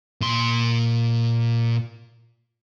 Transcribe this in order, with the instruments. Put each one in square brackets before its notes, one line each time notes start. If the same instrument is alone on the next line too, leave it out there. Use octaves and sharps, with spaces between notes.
[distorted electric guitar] A#2 C6